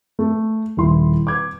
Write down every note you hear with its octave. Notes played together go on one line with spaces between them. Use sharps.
A3
D#1 E4 C6
D6 G#6